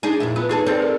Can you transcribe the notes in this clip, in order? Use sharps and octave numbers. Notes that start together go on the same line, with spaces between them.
D4 D#4 G#4
F2 A#2 E4
B3 F4
E2 D#4 G#4 A4 B4
C4 G#4 A4 B4 D5
G#4 A#4 D5